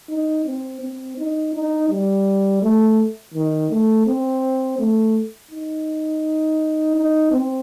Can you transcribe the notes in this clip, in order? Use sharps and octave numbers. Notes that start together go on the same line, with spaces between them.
D#4
C4
C4
D#4
D#4
G3
A3
D#3
A3
C4
A3
D#4
D#4
C4